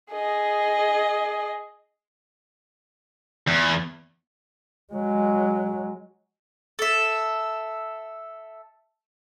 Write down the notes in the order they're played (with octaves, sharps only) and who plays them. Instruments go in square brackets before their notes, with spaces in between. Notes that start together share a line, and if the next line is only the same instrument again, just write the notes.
[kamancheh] G#4 D#5
[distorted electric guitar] E2
[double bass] F#3 G#3
[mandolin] A4 E5